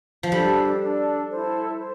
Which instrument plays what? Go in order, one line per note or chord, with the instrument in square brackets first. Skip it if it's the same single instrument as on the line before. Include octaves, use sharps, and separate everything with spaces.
[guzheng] F3
[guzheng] G3 [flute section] D4 A4 D5
[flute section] D4 A4 D5
E4 A4 C5
C5